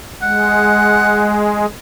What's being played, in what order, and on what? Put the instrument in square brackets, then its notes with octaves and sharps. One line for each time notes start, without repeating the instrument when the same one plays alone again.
[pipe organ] G#3 [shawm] F#5